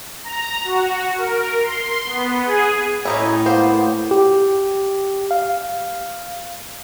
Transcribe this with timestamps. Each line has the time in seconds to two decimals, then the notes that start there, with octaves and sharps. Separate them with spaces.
0.24 A#5
0.64 F#4
1.18 A#4
1.62 C6
2.06 B3
2.46 G#4
3.05 A2 C#4 D#4 E4
3.46 A#3 B3 C5
4.11 G4
5.31 F5